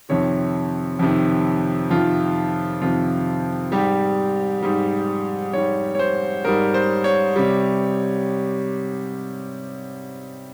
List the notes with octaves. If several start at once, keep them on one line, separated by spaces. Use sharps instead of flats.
F2 C3 D#3 C#5
F2 C3 D#3
F2 C3 D#3 F4
F2 C3 D#3 F4
G#2 G3 G4
G#2 G3
G#2 G3 C#5
C#5
C5
G#2 G3 A#4
C5
C#5
C3 G3